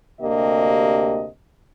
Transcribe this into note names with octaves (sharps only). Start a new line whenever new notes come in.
D2 C3 A#3 D4 G4 D#5